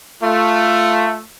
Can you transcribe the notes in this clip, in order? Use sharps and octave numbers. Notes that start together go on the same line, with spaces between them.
A3 F4